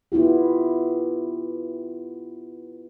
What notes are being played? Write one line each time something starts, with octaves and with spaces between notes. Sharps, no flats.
B3 E4 F4 G4